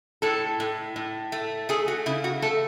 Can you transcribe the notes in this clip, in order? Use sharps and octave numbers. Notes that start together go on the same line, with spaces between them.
A2 A4
A2
A2
A3
A3 G#4
F#4
C#3 E4
F#4
A3 A4